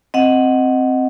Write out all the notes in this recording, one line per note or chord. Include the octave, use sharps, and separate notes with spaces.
C4 D#5 F#5